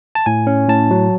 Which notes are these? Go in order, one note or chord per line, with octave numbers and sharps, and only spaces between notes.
A5
A2 G#5
C#4
A2 A5
F#3